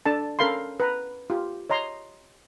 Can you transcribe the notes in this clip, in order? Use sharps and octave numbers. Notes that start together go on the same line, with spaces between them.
D4 A4 A5
C#4 A4 A#4 F5 B5 C6
B4 A#5 B5
F4 G4
C#5 D#5 A#5 C6